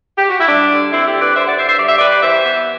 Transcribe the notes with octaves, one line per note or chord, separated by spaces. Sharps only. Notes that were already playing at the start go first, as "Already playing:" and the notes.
G4
F#4
E4
G3 D4
D3
D3 C4 E4
E4 G4
G3
B4 D5
D3 C5 E5
D5 F#5
D3 C5 E5
C5 E5
G3 D5
E5
G3 B4 D5
E3 C5 E5
B3